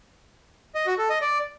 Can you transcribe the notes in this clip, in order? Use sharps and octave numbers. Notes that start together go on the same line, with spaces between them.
D#5
F#4
A4
D#5
D5